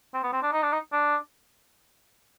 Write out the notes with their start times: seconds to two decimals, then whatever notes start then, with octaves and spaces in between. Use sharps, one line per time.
0.14 C4
0.23 B3
0.33 C4
0.43 D4
0.53 D#4
0.63 D4
0.73 D#4
0.92 D4